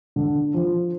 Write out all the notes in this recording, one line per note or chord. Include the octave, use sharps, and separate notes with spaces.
D3
F3